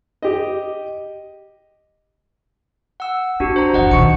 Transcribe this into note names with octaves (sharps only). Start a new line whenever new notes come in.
G4 D#5
F#5 E6
G#3 D4 F#4 G4
C5 A#5
F#2 E3 D#5 F#5 A5
B2 D#3 C#6 C#7